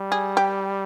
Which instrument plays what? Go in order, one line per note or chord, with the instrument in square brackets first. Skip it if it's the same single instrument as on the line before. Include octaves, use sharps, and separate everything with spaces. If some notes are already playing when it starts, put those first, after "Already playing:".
Already playing: [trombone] G3
[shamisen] G#4
G4